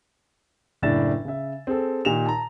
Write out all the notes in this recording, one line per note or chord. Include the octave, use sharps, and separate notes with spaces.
F#1 A2 D4 A6 E7
C#3 E5
C4 G#4 A4
A#2 D#3 D#4 G4 E7 F7
A5 A#5